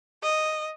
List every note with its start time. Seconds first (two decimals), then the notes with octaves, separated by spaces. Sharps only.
0.23 D#5